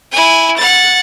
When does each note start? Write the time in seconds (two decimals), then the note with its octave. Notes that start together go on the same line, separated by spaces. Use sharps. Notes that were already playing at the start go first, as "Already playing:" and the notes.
0.12 E4 G#5
0.57 F#5 A6